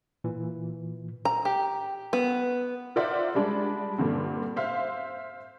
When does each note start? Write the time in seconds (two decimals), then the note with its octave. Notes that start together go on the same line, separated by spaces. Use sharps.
0.24 A#2 E3
1.25 A#5
1.45 G4
2.13 B3
2.96 F4 A#4 C5 D5 E5 F#5
3.35 G3 G#3 D4
3.98 G2 A#2 D3 C4
4.56 C5 E5 F5